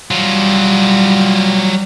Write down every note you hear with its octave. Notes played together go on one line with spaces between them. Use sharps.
F#3 G3 F4